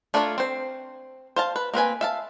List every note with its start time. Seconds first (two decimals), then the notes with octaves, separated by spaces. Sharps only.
0.14 A3 D4 F4 A#4 C#5
0.38 C4 C5
1.36 C5 F5 A5
1.56 B4
1.74 A#3 C4 B4 G#5
2.01 E5 F5 A5